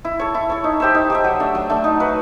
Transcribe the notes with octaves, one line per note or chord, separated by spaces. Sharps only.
E4
A4 C#5
E4
A4 C#5
D#4
G4 C5 E5
D#4
G4 C5 E5
F#3
A3 D4
F#3
A3 D4
D#4
F#4 B4